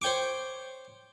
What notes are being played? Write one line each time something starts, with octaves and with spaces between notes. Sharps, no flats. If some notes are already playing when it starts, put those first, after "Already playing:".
C5 C#5 G5 C#6 D6